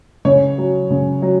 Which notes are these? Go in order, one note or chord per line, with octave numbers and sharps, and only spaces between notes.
C#3 C#5
F#3
C#3
F#3